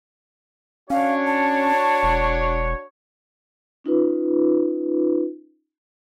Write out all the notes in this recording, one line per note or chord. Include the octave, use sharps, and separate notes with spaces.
C#4 D4 F#4 C#5 F5
A5
E1
C#4 D#4 F4 B4